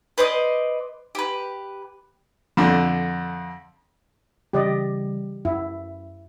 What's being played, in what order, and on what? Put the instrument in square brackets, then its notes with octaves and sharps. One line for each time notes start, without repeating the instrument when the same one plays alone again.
[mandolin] B4 C5 D5 D#5
G4 B4
[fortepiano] F2 D3
[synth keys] C#3 E3 G3 [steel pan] G4 D5 D#5
[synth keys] F#2 [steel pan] E4